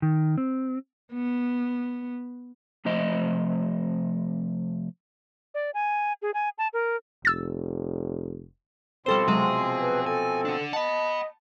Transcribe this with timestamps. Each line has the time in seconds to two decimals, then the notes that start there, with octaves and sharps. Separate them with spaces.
0.02 D#3
0.38 C4
1.13 B3
2.85 C3 F3 A3 C5 D#5
5.54 D5
5.74 G#5
6.22 G#4
6.34 G#5
6.58 A5
6.73 A#4
7.25 F1 E6 A6
9.06 B2 F3 G3 C4 A4 C5 C6
9.28 C3 F#3 G#3 G#4
9.80 B4
10.06 A4 G#5
10.45 D4 F#5
10.73 D#5 F#5 A5 B5